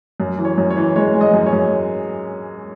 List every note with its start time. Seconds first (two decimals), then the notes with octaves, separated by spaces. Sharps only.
0.20 F#2
0.38 E3
0.45 C#5
0.58 F#2
0.70 C#5
0.77 E3
0.96 G#3 C#5
1.15 G#3
1.21 D#5
1.33 F#2
1.46 C#5
1.53 F#2